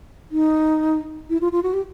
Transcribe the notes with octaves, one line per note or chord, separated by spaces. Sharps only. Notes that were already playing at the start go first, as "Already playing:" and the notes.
D#4
E4
F4
F4
F#4
G4